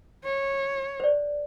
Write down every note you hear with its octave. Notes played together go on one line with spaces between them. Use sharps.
C#5
C5 D5